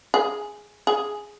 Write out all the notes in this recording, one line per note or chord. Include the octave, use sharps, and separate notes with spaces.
G#4
G#4